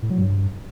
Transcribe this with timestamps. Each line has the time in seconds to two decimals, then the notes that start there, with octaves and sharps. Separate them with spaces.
0.02 A2
0.10 F#3
0.18 G2